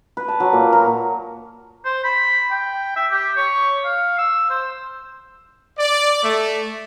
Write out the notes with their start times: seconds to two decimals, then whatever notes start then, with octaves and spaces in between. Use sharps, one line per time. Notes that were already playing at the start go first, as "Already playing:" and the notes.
0.17 B4
0.28 A5
0.40 F#3
0.53 A#2
0.73 A#4
1.85 C5
2.04 B5
2.51 G5
2.96 E5
3.11 G4
3.37 C#5
3.85 F5
4.18 E6
4.50 C5
5.78 D5
6.22 A3